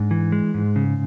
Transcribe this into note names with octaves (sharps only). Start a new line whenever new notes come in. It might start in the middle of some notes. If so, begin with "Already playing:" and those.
Already playing: G#2 D4
E3
G#3
G#2
C#3